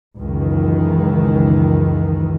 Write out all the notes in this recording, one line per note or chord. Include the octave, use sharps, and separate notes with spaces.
C#2 F#2 D#3 E3